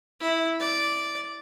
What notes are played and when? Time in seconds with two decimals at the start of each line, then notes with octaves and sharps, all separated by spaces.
0.20 E4
0.59 D5